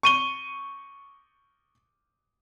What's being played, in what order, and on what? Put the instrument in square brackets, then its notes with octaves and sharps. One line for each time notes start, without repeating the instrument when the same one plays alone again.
[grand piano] C#6 D#7 G7